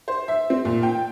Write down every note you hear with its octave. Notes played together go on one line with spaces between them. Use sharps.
C5
E5
C4
A#2
G5